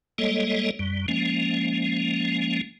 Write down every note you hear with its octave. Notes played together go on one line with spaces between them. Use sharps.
G3 G#3 A#3 A4 C#5 D#5
F#2 G3
F3 G#3 A#3 C#4